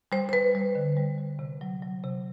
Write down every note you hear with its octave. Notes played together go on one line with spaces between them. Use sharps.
G3 C5
C5
G3 B4
G3
D3
G3
G3
C3
F#3
F#3
C3